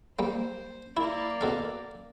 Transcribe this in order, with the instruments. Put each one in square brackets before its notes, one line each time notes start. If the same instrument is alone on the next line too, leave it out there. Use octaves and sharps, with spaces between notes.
[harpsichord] G3 A#3 [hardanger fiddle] C5
[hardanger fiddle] A#3 D5 [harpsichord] E4
[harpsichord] B2 A4 F5